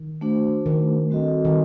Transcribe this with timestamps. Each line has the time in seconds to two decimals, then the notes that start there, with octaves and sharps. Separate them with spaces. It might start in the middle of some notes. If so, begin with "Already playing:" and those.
Already playing: D#3
0.21 A3 D4 F#4 C5
0.66 D#3
1.10 G3 C4 F#4 A4 D#5
1.45 D#3